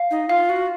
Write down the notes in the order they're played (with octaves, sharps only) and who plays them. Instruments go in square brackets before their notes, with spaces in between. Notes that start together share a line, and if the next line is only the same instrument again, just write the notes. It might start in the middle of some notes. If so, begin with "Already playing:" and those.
Already playing: [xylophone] F5
[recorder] D#4
[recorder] F4 [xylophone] F5
[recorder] F#4